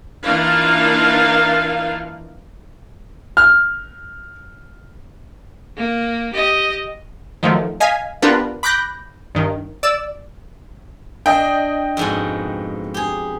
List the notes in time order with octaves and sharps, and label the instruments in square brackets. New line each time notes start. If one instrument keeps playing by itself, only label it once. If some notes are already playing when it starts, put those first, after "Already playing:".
[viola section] E3 A#3 D4 D#4 F4 F5
[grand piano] F6
[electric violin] A#3
G4 D#5
[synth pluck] D#3 F3 F#3 A3
D#5 F5 G#5 B6
B3 D4 F4 G4 A#4 B4
B5 D6 F#6 G6 A#6
G2 D#3
D5 E6
[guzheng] D4 [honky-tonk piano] D#5 G5
[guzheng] F2 G#2 B2
G4 G#4